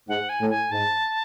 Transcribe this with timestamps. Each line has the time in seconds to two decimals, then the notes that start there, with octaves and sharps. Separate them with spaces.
0.08 G#2 F#5
0.29 G#5
0.40 A2
0.50 G#5
0.71 G#2 A5